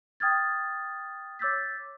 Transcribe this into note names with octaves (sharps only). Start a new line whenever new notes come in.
G5 D#6 F6 G#6 A6
C#5 D6 E6 G6 A6 B6